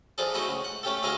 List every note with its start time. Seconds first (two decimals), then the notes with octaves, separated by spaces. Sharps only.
0.18 E3 F3 D4 G#4 A4
0.34 A3 D#4 E4 F#4 G#4
0.48 C#2
0.64 F#5
0.83 A3 C#4 G4 A4
1.03 D2 E4 G#4 D#5 F5 A5